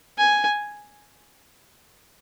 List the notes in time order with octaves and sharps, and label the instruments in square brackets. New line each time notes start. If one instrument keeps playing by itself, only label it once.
[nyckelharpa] G#5